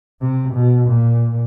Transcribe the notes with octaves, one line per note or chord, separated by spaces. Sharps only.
C3
B2
A#2